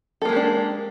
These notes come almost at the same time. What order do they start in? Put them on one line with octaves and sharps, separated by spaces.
A4 A#3 G#3 G4 D4